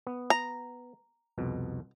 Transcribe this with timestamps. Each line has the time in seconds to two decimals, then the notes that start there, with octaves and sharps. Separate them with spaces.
0.07 B3
0.30 A#5
1.38 C2 F2 B2